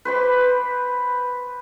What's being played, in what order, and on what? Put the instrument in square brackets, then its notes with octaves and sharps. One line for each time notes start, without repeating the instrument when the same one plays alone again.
[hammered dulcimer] B4 C5 B5 D6